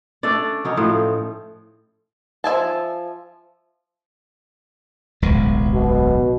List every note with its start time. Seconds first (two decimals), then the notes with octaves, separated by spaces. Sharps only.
0.23 A3 C#4 D4 D5
0.65 F#3 C#4 D#4
0.77 A2 F3
2.44 F3 E5 G#5 A5
5.22 D1 B1 G#3
5.73 B2